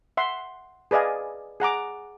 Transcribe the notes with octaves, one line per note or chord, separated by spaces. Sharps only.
E5 F#5 C6
G#4 B4 D5 D#5 F5 G#5
G#4 F#5 A#5 D6